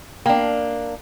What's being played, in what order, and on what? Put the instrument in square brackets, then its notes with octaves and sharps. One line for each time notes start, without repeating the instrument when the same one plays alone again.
[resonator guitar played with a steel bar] A#3 D4 [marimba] G5